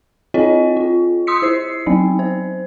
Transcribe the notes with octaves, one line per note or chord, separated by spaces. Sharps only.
C4 F4 C#5 D#5 G5
F4
C6 D#6 E6 B6 C#7
E4 C5 C7
F#3 B3 C4 D#4
C5